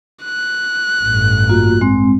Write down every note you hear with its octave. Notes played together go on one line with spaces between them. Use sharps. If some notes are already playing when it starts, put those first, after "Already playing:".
F#6
A1 G2
A#3 F4 F#4
G#3 C4